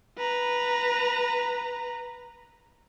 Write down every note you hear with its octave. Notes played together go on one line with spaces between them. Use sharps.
B4 A#5